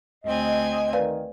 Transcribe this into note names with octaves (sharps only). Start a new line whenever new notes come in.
D2 C4 D#5 G#5
D#3 B4 D5 F5